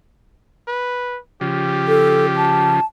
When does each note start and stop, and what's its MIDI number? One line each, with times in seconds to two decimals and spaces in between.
0.68 1.18 71
1.41 2.80 49
1.41 2.80 53
1.41 2.79 67
1.88 2.26 69
2.36 2.85 81